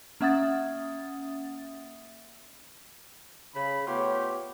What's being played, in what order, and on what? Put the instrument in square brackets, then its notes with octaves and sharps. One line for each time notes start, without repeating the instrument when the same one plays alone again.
[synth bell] A#3 C#4 E5 F#5 D#6 A6
[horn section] C#3 B5
A3 B3 F4 G4 C#5